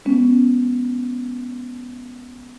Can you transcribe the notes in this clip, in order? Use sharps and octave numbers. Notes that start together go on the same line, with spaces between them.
G#3 B3 C#4